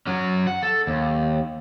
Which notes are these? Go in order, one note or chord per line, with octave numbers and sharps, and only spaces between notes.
F#3 C#4
F#5
A4
D#2